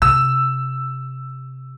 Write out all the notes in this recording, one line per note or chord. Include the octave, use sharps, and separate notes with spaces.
C3 E6